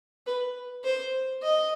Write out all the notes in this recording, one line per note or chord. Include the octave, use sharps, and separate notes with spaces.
B4
C5
D#5